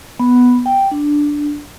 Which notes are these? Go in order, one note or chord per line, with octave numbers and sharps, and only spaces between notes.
B3
G5
D4